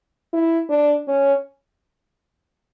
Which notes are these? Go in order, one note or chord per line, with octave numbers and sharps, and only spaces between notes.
E4
D4
C#4